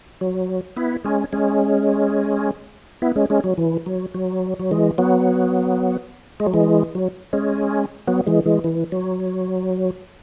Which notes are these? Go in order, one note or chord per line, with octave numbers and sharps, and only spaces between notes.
F#3
B3 E4
G#3 C#4
G#3 C#4
B3 E4
G#3 C#4
G#3 C#4
F#3
E3
F#3
F#3
F#3
E3 G#3
F#3 B3
G#3
F#3
E3 G#3
F#3
G#3 C#4
F#3 B3
E3 G#3
E3 G#3
E3
F#3